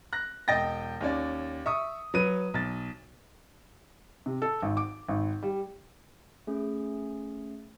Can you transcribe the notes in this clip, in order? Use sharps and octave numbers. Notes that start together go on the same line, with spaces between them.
F#6 A#6
E1 D#5 G5 A6 A#6
D#2 C#4 D5
E5 C#6 D#6
F#3 B4 D#7
B1 A6
C3
A4
G#1
D6
G#1
G3
A3 C#4 G#4